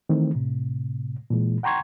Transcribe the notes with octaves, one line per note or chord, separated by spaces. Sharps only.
D#3 E3 A3 C4
A2 C3
A#2 E3 G#3
F#5 G5 A#5 C6 C#6 G#6